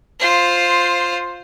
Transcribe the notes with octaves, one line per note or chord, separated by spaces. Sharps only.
F4 C5